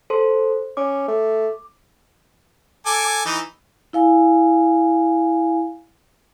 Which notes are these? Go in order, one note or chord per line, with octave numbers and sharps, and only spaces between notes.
A4 C5 C6
C#4 D6
A3
A4 G#5 D6
E3 D#4
E4 F5 G#5